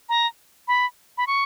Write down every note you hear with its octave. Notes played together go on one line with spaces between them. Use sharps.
A#5
B5
B5
C#6